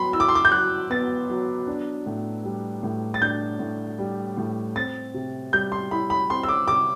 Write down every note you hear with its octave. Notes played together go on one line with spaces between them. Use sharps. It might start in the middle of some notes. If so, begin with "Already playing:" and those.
Already playing: F#3 B3 B5 C6
E4 E6
D6
C6
D6
G6
F#3 F#6
B3 A6
F#3
D4
A2
G3
A2
A6
D4 G6
A2
G3
A2
C4 A6
C3
G3 G6
C6
E4 B5
B5
C4 C6
E6
D6
C3 D6